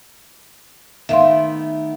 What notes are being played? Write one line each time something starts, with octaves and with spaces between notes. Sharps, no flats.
D#3 A3 B3 E5 F5 C6